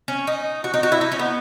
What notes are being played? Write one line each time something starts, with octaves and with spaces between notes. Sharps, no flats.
C#4
D#4
F#4
D#4
F#4
E4
D#4
C#4
B3